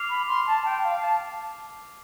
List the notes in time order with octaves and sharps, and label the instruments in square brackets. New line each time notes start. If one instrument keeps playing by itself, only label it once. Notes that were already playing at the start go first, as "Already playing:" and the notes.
Already playing: [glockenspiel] D6 F6 C7 F7
[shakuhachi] B5
C6
A5
G5
F5
A5